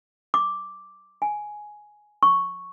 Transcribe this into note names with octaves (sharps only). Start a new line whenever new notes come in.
D6
G#5
C#6